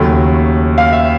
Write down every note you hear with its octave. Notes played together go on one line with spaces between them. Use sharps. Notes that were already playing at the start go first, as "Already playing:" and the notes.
Already playing: D#2 C#3 F#3 A3
F5
E5